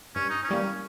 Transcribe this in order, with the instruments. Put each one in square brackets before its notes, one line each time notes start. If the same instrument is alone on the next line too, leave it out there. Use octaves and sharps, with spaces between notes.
[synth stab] G2 [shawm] C#4
[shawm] D#4
C#4
[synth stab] E3 G3 A#3